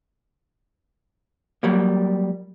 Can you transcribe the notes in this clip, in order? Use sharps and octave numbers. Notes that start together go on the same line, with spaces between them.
F#3 G3 A#3